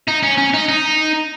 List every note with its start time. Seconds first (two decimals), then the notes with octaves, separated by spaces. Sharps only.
0.08 D#4
0.23 C#4
0.38 C#4
0.54 D#4
0.68 D#4